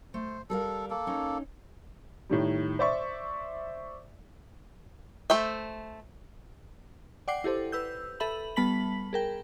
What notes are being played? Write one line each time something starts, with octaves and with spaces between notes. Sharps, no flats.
A3 C5
G3 A4 A#4 F5
A#3 A4
C#4 D#4
A2 D#3 G3
C5 D5 E5 C#6
A3 C5 E5
D5 F#5 G5 D6 C7
E4 G4 A4 C5
B4 E6 G6
A4 E5 B5 F#7
G3 B3 A5 B5 B6 F#7
G#4 A#4 G5